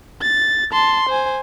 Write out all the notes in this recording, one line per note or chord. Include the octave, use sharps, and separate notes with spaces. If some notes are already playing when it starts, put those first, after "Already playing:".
A6
A5 C6
C5 G#5